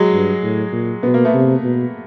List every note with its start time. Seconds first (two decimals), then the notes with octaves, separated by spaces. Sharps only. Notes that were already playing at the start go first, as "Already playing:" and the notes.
Already playing: F#3 G#3
0.13 G2
0.43 A2
0.73 A#2
1.03 B2 B3
1.14 A#3
1.25 A3 B3
1.34 C3
1.64 B2